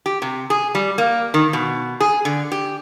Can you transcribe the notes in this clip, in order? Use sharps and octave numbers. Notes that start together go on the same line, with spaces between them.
G4
C3
G#4
G3
A#3
D#3
B2
G#4
D3
G4